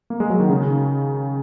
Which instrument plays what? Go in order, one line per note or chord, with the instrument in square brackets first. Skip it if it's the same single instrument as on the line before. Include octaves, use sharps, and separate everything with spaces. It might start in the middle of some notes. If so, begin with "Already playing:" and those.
[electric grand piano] A#3
G#3
F#3
D#3
C#3